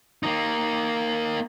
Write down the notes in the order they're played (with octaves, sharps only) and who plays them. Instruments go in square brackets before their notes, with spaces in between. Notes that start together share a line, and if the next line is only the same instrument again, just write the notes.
[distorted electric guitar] A#3 D#4